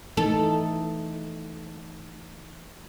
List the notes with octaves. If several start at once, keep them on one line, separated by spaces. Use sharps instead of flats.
E3 A3 D#4 A4